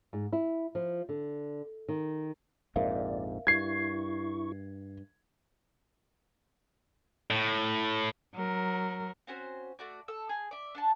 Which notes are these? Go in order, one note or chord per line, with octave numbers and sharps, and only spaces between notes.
G#2
E4
F3
D3
D#3
A#1 F2 G#2 A#4 D5 E5 F5
G2 E4 C#6 G#6 C7
A2
F#3 A#4
C4 C#4 F#4 C5
A3 F#4 D5
A4 E6
G#4
D5 E5
D4 F#5 A5